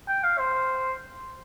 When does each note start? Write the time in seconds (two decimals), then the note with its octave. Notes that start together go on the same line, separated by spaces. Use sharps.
0.08 G5
0.24 F5
0.38 C5